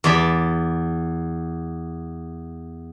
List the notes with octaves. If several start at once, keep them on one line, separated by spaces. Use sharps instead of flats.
E2 D5 B5